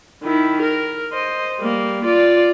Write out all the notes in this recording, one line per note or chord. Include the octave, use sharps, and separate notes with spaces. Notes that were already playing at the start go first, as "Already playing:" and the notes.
D#3 E4
A#4
C5 D#5
G3 A#3
F4 D5